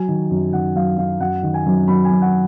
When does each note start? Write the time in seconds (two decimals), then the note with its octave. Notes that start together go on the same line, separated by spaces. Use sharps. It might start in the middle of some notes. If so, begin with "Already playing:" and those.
Already playing: F#3 G#5
0.08 D#3
0.31 F#2
0.53 D#3 F#5
0.76 F#3 F5
0.97 F#3 F5
1.20 F#2 F#5
1.43 D#3
1.54 G#5
1.66 F#2
1.88 F#3 B5
2.05 G#5
2.11 F#2
2.22 F#5